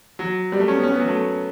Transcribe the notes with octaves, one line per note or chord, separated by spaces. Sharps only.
F#3
G3
A3
C#4
B3
C#4
B3
F#3
A3